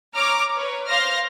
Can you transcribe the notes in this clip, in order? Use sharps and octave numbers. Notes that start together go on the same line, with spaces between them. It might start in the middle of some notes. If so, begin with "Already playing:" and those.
C#5 A#5 D6 F6
B4 C#5
C5 F5 C6 F6 A#6